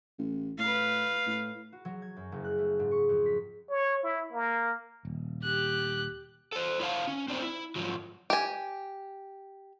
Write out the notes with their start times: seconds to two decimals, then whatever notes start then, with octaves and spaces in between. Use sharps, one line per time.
0.18 A1
0.59 A2 B4 F5
1.26 A2
1.72 F#4
1.85 F#3
2.02 G#6
2.17 F#2
2.32 F#1
2.44 F#6
2.58 A3
2.80 G#2
2.91 C#6
3.09 F2
3.26 B6
3.69 C#5
4.03 E4
4.32 A#3
5.05 D#1
5.44 G4 F#6
6.52 A4 C5
6.80 E4 C#5 F5 A5
7.07 C#4
7.28 C4 D4 D#4 C5
7.42 E4
7.76 G#2 F3 F#3
8.30 G4 G#5